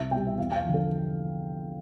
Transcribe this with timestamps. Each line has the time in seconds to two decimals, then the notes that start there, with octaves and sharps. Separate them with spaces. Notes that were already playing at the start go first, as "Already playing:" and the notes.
Already playing: C2 E5
0.11 B2 G3 G5
0.27 E5
0.38 E2 F5
0.52 G5
0.56 F5
0.65 D3 F3
0.74 A4